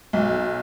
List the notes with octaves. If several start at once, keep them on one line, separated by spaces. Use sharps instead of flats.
B1